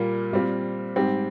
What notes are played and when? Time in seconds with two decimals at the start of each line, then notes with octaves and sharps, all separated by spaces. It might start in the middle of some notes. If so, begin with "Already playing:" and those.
Already playing: A#2 G3 A#3 F4
0.33 A#2 G3 C4 F4
0.96 G#2 G3 C4 G4